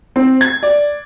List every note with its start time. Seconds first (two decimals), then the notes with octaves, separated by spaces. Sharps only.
0.16 C4
0.41 G#6
0.63 D5